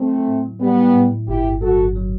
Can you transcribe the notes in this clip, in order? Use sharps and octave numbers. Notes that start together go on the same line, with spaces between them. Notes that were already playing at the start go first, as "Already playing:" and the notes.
Already playing: F#3 A3 C4
E4
A2
F#3
A2 G3 B3
E4
A2
A2
G1 E4 G4
G2
F#3 F#4 A4
G1
F#3